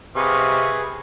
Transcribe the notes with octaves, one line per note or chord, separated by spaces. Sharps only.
C3 G#4 B4 D#5 F5 C#6